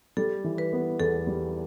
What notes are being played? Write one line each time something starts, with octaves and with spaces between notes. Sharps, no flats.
G3 A4
E3
B4
B3
E2 A4
G3